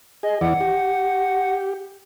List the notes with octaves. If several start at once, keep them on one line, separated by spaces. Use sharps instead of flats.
G#4 D#5
E2 E3 D5 F#5
G4